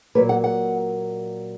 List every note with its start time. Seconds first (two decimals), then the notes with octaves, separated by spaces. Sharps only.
0.15 A#2 F#3 A#3 B4
0.29 F#5
0.44 F#5